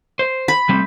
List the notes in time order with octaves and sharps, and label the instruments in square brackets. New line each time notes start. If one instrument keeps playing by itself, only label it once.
[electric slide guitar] C5
[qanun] B5
[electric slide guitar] G3 A3 C4